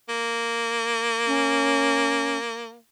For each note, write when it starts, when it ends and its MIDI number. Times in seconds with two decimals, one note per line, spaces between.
0.09 2.77 58
1.27 2.38 61